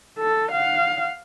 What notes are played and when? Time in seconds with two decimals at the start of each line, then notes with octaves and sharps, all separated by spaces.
0.19 A4
0.51 F5 F#5